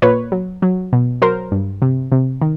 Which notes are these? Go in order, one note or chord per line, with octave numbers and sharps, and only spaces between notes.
A#2 B4 C#5
F#3
F#3
B2
F#3 A#4 C5
G2
C3
C3
D#3